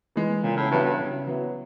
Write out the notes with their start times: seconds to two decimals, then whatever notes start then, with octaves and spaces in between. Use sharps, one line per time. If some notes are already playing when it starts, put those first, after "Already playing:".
0.16 E3 G#3
0.43 A#2 C#3
0.57 A2
0.71 G2 F#3 B3 E4
0.85 G2
0.99 C#3
1.27 F#3 B3 E4